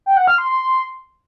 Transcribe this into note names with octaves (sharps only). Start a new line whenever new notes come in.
G5
F#5
F6
C6
C6